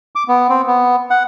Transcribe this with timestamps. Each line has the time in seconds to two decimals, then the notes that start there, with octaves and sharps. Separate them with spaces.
0.15 D6
0.28 B3
0.49 C4
0.67 B3
1.10 F#5